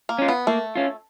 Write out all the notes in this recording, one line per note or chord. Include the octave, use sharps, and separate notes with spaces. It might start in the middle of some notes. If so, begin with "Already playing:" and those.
A#3
C#4 F4
B3
A3 A#3
C#4 F4